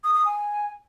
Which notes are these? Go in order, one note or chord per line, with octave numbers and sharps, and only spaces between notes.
D#6
D#6
G#5